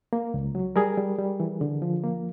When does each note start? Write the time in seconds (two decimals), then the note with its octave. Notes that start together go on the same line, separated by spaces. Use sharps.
0.13 A#3
0.34 C#2
0.55 F#3
0.76 G3 G#4 A#4
0.97 G3
1.19 G3
1.40 E3
1.61 D3
1.82 F3
2.04 A#3